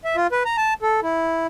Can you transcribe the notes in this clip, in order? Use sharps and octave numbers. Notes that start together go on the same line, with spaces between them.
E5
F4
B4
A#5
A5
A4
E4